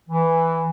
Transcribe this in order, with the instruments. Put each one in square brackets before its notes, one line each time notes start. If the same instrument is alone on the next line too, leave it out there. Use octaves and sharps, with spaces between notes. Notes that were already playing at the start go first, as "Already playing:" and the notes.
[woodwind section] E3